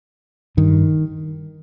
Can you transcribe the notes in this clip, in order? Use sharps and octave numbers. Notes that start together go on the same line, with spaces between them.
G2 D#3